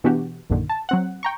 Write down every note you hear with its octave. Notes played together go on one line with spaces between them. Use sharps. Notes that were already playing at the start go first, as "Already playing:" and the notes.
B2 E3 B3 D4 F#4 G4
A#1 F#2 A#2 D3 D#3
A5
F#3 C4 F#5
G5 A#5 C#6